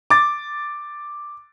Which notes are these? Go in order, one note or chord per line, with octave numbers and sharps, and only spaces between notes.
D6 A6